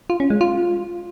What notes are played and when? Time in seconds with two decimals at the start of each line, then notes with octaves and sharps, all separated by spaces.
0.10 F4
0.20 C#4
0.30 G#3
0.41 F4